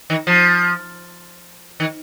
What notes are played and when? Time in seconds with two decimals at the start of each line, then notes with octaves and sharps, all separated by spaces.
0.10 D#3
0.27 F3
1.80 D#3